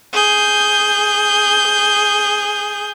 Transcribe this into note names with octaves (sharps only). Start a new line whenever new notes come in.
G#4 G6